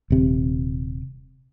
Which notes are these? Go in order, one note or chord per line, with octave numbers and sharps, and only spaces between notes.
D#1 C3